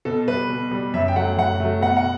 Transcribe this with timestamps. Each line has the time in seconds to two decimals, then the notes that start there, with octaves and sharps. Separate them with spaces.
0.05 B2 A4
0.28 G3 B4
0.49 B2
0.71 G3
0.94 F#2 E5
1.08 G5
1.16 F#3 A3 F#5
1.38 F#2 F#5
1.60 F#3 A3
1.82 B2 F#5
1.97 F#5